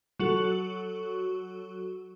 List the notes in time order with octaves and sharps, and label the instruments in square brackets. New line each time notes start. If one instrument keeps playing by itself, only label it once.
[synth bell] F#3 F#4 A4